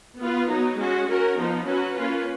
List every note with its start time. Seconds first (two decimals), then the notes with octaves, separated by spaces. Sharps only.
0.18 B3 F4 B4
0.48 F#3 B3 D#4
0.77 G#3 C#4 F#4
1.07 C#4 F#4 A#4
1.36 F3 B3 D#4
1.66 F#3 C#4 F#4 B4
1.95 A#3 C#4 F4 B4